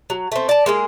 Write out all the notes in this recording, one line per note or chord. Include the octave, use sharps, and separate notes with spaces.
F#3
A3 C4
D5 A5
G#3 A#3 G#4